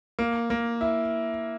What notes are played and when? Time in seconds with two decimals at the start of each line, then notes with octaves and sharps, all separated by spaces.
0.19 A#3
0.50 A#3
0.81 E4